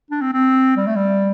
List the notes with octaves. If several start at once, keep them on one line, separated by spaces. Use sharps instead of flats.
D4
C4
C4
G3
A3
G3